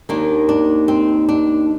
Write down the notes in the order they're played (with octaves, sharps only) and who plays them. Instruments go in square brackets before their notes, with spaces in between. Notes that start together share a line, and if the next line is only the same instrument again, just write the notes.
[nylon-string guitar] D#2 D#3 A#3 D4
D4
C4
D4